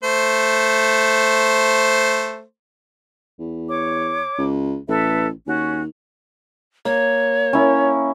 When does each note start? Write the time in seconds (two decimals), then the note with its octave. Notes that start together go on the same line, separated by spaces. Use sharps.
0.03 A3 C5
3.39 E2
3.69 C#5 D6
4.38 C#2
4.88 A1 A4 B4 E5
5.47 D#2 C#4 F#4
6.85 A#3 C#5
7.53 C#4 E4 A#4